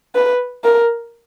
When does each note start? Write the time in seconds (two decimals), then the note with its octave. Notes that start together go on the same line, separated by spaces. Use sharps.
0.15 B4
0.64 A#4